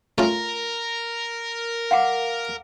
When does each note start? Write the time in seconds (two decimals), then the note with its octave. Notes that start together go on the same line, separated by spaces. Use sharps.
0.18 A3 C#4 F4 A#4
1.91 F5 F#5 D6